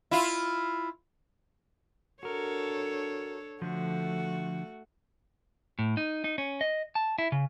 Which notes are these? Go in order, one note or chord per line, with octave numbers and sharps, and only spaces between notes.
E4 F4
D4 F#4 A4 A#4 C#5
D3 F3 A3 F#4
A2
D#4
D#4
C#4
D#5
A5
E4
C#3